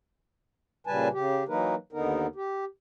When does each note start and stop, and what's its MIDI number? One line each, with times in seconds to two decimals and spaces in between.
0.87 1.08 46
0.87 1.08 49
0.87 1.08 55
0.87 1.08 71
0.87 1.08 80
0.87 1.08 81
1.13 1.44 49
1.13 1.44 67
1.48 1.75 52
1.48 1.75 54
1.48 1.75 58
1.48 1.75 63
1.48 1.75 70
1.48 1.75 71
1.93 2.27 39
1.93 2.27 50
1.93 2.27 59
1.93 2.27 63
1.93 2.27 70
2.35 2.65 67